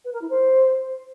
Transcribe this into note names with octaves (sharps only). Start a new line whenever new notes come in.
B4
A#4
E4
C5